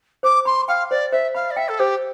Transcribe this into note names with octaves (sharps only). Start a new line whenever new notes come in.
C5 D6
B5 C6
F5 G5
C5 D5
C5 E5
F5 B5
D5
E5 G5
A4
G4 C5